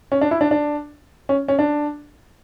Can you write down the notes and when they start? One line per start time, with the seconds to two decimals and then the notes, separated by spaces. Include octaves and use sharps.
0.12 C#4
0.21 D4
0.31 E4
0.41 D4
0.51 D4
1.29 C#4
1.48 C#4
1.59 D4